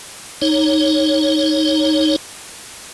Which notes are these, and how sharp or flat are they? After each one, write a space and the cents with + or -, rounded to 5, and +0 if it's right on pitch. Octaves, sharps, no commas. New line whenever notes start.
D#4 +0 C#5 +0